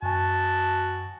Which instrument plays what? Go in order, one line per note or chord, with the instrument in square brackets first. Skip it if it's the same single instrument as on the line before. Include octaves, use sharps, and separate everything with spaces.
[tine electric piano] F#2 G#5 [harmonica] F#4 A5